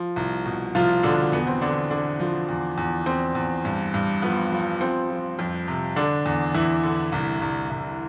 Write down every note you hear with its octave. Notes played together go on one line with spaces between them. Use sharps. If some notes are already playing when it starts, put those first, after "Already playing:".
Already playing: F3
C2
B2
C2 F3 F4
B2 D3 D4
E2 B3
C4
E2 D3 D4
D3 D4
F3
E2
E2
E2 C4
E2
G2
G2
F3 B3
F3
F3 C4
F3
F2
C3
D3 D4
E2
E2 E3 E4
D3
C2
C2
C2